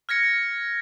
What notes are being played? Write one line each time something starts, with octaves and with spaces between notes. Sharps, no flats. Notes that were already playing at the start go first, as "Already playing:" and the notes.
F6 G#6 A#6 C#7